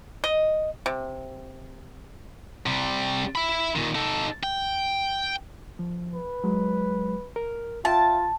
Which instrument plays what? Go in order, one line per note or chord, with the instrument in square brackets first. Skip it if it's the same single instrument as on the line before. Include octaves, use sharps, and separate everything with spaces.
[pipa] D#5
C3
[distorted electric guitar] C3 G3
E5 B5
A#2 D#3
D#4 A4
G5
[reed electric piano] F3
[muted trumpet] B4
[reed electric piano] F#3 G#3
A#4
[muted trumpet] F4 [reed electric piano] E5 G5 [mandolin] A5